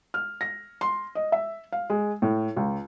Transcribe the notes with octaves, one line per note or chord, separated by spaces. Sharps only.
F6
A#6
C6
D#5
E5
F5
G#3
A2
C#2